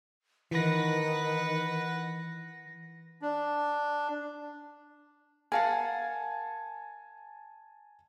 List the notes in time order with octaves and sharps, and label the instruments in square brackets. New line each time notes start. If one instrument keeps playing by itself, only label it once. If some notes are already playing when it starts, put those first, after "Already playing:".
[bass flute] D#3 [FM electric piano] E3 A#6 [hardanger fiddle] B4 F#5
[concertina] D4
[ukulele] A#4 F5 F#5 [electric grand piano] G#5 A5